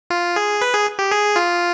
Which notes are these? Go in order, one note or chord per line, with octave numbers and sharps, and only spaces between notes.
F4
G#4
B4
G#4
G4
G#4
F4